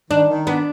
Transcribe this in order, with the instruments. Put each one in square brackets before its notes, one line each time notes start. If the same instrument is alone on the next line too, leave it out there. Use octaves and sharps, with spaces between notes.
[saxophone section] D#3 [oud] D4
[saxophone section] D#3
[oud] B3 [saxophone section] D4